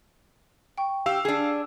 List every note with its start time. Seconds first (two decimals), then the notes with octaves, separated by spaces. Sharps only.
0.78 G5 C#6
1.06 G4 F5 E6
1.25 D4 G#4